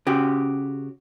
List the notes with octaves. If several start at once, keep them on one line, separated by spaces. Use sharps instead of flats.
C#3 F#4 G4